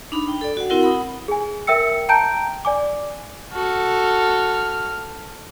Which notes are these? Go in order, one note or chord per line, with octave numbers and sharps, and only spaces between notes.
D4 D#4 B5
G5
A4 D5
F#4 F#5
C4 E4 F#4 A#4 F#5
F#5 B5 D#6
G#4 G#5
A#4 E5 G5 E6 C#7
G5 A5 A#5 G6 D7
D5 G#5 D6
F#4 A4 F6